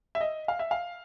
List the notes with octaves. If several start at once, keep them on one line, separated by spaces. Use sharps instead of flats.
E5
D#5
F5
E5
F5